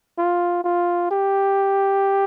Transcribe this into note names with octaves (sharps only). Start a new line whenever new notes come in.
F4
F4
G4